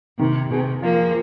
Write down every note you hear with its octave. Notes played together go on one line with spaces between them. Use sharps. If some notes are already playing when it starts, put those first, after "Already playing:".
C3 D#3
C3 G#4
F3 A#3 F4